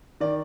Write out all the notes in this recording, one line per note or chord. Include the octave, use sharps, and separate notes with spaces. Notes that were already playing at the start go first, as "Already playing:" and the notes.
D#3 D5